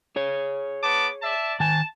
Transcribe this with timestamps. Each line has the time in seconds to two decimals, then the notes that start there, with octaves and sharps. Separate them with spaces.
0.16 G#4 C#5
0.84 B3 A5 D6
1.23 D5 E5 A5
1.60 D#3 G#5 A5